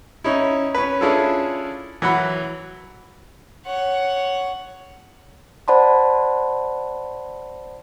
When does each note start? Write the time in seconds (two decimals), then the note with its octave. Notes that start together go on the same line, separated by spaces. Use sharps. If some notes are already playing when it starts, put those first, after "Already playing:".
0.24 C#4 D#4 E4
0.75 C#4 B4
1.01 C#4 D4 E4 F4 G#4 A4
2.02 E3 F#3 F#5 B5
3.66 C#5 F#5
5.68 C5 D5 F#5 A5 B5 C6